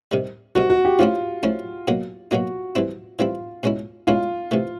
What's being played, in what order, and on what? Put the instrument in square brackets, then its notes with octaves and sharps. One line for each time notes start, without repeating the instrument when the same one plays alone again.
[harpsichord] C3 D#3 G3
[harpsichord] C3 D#3 G3 [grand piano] F#4
[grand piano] F#4
G4
[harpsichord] F3 A3 C#4 E4 [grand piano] F4
[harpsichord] F3 A3 C#4 E4
B2 F#3 A#3 D#4
[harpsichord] B2 F#3 A#3 D#4 [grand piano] F#4
[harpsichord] E3 G3 C4 E4
[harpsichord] E3 G3 C4 E4 [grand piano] F4
[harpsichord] B2 G#3 C#4 E4
[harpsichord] B2 G#3 C#4 E4 [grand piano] F4
[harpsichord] C3 E3 A3